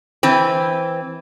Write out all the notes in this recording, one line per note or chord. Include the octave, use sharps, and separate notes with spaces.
E3 C4